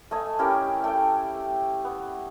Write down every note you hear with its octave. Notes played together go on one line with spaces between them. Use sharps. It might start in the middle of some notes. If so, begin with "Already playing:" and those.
A3 D#5 G#5
C#4 E4 G4 A#4
A3 G5
B3